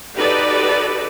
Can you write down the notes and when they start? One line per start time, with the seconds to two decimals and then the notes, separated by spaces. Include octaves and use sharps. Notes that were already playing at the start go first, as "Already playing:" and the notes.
0.16 D#4 F#4 G4 A4 B4 D5